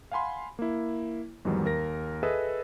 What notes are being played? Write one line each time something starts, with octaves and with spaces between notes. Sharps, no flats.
F5 F#5 G#5 B5 C6
A#3 E4
E2 G#2 D#3 F#3 G3
D#2 A#4 A#6
G#4 A4 B4 D#5 E5 E6